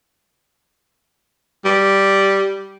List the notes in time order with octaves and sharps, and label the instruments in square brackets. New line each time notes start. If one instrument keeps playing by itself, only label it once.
[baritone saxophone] G3